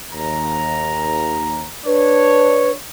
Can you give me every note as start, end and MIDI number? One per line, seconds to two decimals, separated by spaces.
0.13 1.69 39
0.13 1.69 82
1.86 2.74 62
1.86 2.71 71
1.86 2.74 73